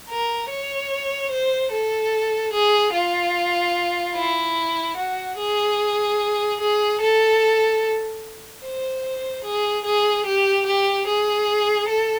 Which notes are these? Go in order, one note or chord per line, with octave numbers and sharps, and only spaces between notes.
A#4
C#5
C5
A4
G#4
F4
E4
F#4
G#4
G#4
A4
C5
G#4
G#4
G4
G4
G#4
A4